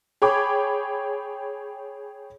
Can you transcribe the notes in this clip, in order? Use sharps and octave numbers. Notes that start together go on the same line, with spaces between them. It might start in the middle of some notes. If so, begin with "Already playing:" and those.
G#4 C#5 G5 B5 D6